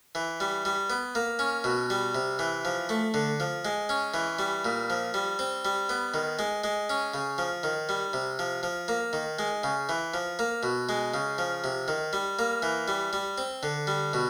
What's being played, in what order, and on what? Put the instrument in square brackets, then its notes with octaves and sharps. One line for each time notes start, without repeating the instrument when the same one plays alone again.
[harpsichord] E3
G3
G3
B3
A#3
C#4
B2
G3
C3
E3
F3
A3
D3
F3
G#3
C#4
E3
G3
A#2
F3
G3
C4
G3
B3
D#3
G#3
G#3
C#4
C#3
F3
D#3
G3
C3
F3
F3
A#3
D#3
G#3
C#3
E3
F3
A#3
B2
G#3
C#3
F3
C3
D#3
G3
A#3
E3
G3
G3
C4
D3
G3
B2